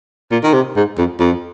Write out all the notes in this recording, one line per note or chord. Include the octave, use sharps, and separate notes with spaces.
A#2
D#3
C3
G#2
F2
F2